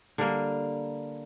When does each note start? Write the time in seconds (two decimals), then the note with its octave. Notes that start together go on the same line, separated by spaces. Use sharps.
0.18 D3 G3 A#3